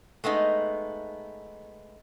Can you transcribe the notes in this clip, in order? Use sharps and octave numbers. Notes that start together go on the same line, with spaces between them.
G#3 A3 B3 D#4